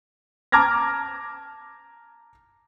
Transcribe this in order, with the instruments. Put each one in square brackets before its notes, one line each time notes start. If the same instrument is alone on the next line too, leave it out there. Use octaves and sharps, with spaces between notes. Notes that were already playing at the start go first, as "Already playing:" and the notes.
[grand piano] A5 A#5 D6 F6 G#6 A#6